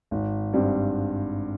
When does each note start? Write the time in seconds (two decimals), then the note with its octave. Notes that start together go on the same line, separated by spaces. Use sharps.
0.11 G#1
0.53 G2 G3 C4